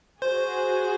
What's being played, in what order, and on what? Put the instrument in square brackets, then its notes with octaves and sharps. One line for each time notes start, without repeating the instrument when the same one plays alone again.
[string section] F#4 G#4 [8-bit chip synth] C5